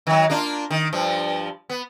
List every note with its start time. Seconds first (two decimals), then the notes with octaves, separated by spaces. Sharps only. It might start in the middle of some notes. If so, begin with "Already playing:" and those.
0.07 D#3 F#3
0.30 A#3 D4 F4
0.71 D#3
0.93 G2 F3
1.70 B3